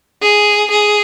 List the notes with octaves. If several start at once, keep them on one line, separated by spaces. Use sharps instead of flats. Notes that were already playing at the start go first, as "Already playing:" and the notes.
G#4
G#4